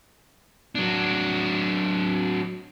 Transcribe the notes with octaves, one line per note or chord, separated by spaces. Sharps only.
F#3 D4